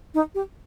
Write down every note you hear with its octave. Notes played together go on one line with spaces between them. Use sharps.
D#4
G4